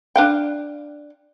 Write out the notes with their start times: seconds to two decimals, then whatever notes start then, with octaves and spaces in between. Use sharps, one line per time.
0.16 D4 F5 G5